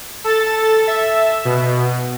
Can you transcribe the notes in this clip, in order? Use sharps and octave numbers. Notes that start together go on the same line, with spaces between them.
A4 A6
E5
B2